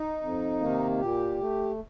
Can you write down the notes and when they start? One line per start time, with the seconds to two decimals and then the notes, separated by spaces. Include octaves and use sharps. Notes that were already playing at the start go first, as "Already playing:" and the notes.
Already playing: D#4
0.22 F2
0.61 C3 D#3 A#3
1.00 A#2 G4
1.41 A3